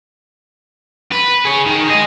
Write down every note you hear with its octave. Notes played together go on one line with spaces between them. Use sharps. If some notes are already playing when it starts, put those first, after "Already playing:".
B4
G#4 C#5
D#3
G#4 D#5